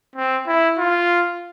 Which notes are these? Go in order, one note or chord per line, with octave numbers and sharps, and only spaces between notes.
C4
E4
F4